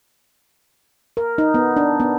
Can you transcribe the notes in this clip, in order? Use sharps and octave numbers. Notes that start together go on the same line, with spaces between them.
A#4
D#4
B3
D4
B3